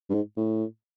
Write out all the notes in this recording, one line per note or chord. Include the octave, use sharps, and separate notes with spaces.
G2
G#2
A2